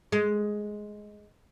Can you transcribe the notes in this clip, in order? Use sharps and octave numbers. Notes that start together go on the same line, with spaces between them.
G#3